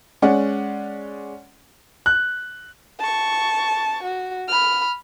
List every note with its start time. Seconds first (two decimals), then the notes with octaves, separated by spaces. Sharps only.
0.22 G#3 C#4 D5 F#5
2.06 F#6
3.00 A5 C#6
4.04 F#4
4.48 B5 F6